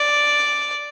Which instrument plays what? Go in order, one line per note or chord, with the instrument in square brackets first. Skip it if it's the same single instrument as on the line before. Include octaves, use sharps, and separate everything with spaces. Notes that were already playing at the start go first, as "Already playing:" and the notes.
Already playing: [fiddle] D5